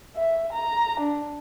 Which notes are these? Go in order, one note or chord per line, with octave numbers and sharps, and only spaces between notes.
E5
A#5
D4